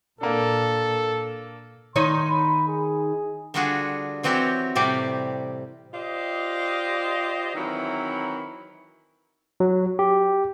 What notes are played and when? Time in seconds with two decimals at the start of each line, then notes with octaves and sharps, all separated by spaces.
0.21 A#2 A#3 D4 A4
1.96 D#3 D#4 C#5 C6
2.29 B5
2.67 G#4
3.54 D3 G3 D4 F4 F#4 G#4
4.23 E3 F#3 C4 F#4 G4 C#5
4.75 A2 C3 G3 G4 D5
5.93 F4 G4 C5 D5 D#5
7.55 D#3 E3 F#3 C4 E4
9.60 F#3
9.99 G4